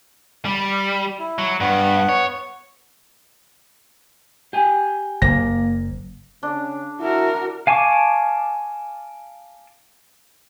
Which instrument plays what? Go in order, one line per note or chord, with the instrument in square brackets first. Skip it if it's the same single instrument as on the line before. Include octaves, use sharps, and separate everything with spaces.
[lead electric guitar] G3 [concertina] B5
[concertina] E4
[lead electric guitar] F#3
[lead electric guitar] G2 [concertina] B3 F#5
[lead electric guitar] C#5
[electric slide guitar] G4 G#5
[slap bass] F#1 [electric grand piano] A#3 A#6
[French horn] C#3 [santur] D4
[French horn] E4 [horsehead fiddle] F#4 A#4
[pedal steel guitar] F5 G#5 A5 C#6 D6